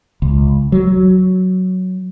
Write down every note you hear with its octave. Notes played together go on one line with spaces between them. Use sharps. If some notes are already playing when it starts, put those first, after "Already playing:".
C#2
F#3